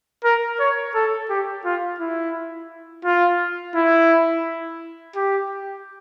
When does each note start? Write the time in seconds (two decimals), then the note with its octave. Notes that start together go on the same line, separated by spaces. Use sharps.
0.24 A#4
0.60 C#5
0.95 A4
1.30 G4
1.65 F4
2.00 E4
3.05 F4
3.75 E4
5.16 G4